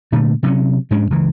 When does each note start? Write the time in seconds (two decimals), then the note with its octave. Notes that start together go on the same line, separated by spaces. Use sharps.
0.12 A#2 D3 A3
0.43 C3 F#3 C#4
0.91 G#2 G#3 C#4 D4
1.10 C#2 E3